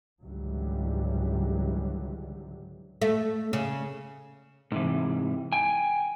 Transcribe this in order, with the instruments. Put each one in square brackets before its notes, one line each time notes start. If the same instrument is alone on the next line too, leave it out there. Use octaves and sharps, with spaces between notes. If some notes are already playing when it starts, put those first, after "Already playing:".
[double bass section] C#2 G#2 D3 E3 F#3 G3
[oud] A3
C#3
[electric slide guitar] G#2 C3 E3
G5 G#5